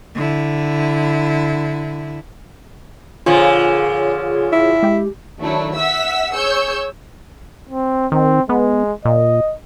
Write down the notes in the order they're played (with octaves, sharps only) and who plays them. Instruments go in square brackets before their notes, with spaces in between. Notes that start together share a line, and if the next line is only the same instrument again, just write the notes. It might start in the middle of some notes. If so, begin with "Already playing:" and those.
[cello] D3 E4
[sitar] A#2 D3 F3 [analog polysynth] F4 G#4 C#5
[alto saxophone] E4
[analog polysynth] G#3 G4
[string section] D#3 F#3 A3 D4 E4
E5 F#5 E6 B6
G#4 C#5 E6 G6 C#7
[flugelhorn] C4
[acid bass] D#3 [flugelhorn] C4
[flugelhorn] G#3 [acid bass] B3
[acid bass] A#2 [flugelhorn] D#5